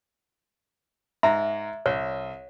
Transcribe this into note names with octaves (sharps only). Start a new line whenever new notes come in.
G#2 E5 A#5
C2 C#5